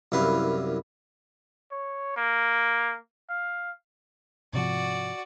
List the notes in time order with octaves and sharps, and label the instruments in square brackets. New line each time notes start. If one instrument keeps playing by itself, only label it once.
[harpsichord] C2 F#2 E4 B4 F5
[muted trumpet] C#5
A#3
F5
[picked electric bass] G#2 C3 F3 [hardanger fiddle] F#4 D5